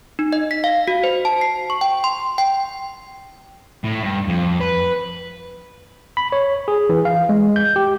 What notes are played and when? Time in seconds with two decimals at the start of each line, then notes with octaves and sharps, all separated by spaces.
0.19 D#4
0.33 D#5
0.51 B6
0.64 F5
0.88 F#4
1.04 C5
1.25 A5
1.41 C7
1.70 C#6
1.81 G5
2.04 C6
2.38 G5
3.84 A2
4.03 G2
4.28 F2
4.61 B4
6.17 B5
6.32 C#5
6.68 G#4
6.90 E3
7.05 F5
7.29 G#3
7.56 G6
7.76 G4